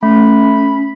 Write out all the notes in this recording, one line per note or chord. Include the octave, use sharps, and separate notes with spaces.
A3 C#4 B5